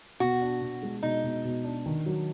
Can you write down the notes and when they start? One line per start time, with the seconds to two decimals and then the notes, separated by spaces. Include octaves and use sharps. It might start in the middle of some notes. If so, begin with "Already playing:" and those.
0.20 B2 F#4
0.41 D4
0.61 B2
0.82 G#3
1.03 B2 D#4
1.24 B2
1.45 B2
1.64 D4
1.86 D#3
2.06 F#3